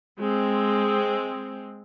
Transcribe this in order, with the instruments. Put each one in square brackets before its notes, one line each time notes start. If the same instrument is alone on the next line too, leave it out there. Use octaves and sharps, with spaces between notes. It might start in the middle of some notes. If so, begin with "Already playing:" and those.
[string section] G#3 C4